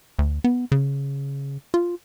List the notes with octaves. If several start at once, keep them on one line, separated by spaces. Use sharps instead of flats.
D2
B3
C#3
F4